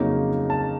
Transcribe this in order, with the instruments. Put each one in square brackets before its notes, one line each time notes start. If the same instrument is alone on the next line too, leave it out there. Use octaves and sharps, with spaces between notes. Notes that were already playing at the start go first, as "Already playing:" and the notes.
Already playing: [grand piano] F2 C#3 F#3 A#3 D#4
A5